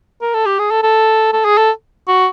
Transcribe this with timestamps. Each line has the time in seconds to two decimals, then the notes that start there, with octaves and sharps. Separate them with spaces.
0.21 A#4
0.34 A4
0.46 G4
0.59 G#4
0.71 A4
0.83 A4
1.33 A4
1.45 G#4
1.58 A4
2.08 F#4